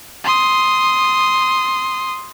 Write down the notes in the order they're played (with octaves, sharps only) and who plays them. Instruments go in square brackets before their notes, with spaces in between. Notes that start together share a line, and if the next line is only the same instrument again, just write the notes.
[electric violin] C6 D#6